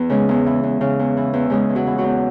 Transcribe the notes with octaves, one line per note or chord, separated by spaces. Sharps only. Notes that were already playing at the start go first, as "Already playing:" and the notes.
Already playing: E2 E3
C#3 G#3 G#4
E2
E3
E2
C#3
E2
E3
E2
C#3 G#3 G#4
E2
F#3 F#4
E3
F#3 F#4
E2